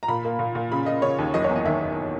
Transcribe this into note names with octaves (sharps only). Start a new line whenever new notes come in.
A#5
A#2 B5
A#3
A#2
A#2
C#3 B5
C#3 D#5
C#3 C#5
D#2
F#1 D#5
C#5
E2
D#5
D#3 E5